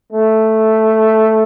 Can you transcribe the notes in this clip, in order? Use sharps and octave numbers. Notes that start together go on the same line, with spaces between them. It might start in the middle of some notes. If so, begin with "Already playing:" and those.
A3